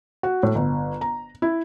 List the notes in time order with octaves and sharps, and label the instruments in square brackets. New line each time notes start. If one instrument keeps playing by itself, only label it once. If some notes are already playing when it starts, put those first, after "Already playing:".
[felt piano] F#4
A2
G1
A#5
E4